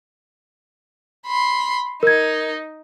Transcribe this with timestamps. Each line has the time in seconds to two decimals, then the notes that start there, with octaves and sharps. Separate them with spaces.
1.27 B5 C6
2.03 D#4 A#4 G#6